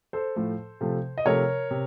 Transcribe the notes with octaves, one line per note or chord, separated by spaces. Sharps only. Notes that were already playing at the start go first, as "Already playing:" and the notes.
A4 C5
A2 F3 A3
C3 F3 A3
D#5
C3 F3 A3 A#4 C#5
C3